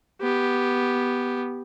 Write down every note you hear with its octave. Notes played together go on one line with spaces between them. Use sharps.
B3 G4